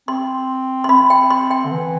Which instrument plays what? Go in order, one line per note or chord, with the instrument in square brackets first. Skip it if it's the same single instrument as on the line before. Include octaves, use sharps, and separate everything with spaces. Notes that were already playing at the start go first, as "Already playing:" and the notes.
[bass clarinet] C4 [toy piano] C6
[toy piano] C6
[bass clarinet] C4 [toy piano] B5
[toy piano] G5
C6
G5
[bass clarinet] D3
E3